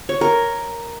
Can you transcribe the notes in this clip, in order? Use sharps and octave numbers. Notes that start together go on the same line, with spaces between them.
C#5
A#4